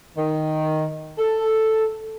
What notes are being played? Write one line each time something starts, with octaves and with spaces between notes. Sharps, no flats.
D#3
A4